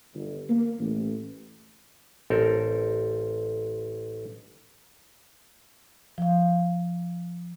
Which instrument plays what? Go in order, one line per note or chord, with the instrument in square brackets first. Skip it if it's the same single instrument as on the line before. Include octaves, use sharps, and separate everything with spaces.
[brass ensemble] G1
A#3
A1
[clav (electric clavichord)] A1 C4 A4 A#4
[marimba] F3 F5